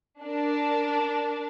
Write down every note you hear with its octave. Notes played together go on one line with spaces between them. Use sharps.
D4 A#4